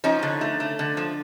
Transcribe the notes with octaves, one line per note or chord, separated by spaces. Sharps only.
F3 C#4 D#4
D3
A3
A3
D3
F3